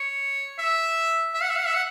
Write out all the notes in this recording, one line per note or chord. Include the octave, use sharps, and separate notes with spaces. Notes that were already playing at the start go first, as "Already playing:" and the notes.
Already playing: C#5
E5
E5
F#5
E5
F#5
E5
F#5